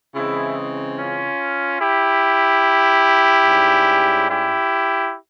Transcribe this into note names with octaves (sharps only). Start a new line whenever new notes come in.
C#3 E3 G#3 C4 E4
C#4 F4
E4 G4
G#2 G3 C#4
E4 G4